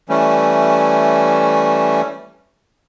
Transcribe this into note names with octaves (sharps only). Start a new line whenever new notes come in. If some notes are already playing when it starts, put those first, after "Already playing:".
E3 G3 A3 C#4